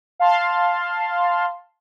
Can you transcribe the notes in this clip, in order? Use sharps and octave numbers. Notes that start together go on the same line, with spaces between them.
F5 A5 C6